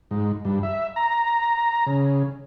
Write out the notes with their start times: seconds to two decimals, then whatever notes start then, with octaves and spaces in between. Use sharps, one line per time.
0.11 G#2
0.45 G2
0.63 E5
0.96 A#5
1.86 C#3